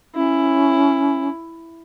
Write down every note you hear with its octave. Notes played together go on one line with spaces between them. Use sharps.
C#4 E4